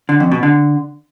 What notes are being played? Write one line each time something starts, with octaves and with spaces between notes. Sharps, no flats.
D3
F2
B2
D3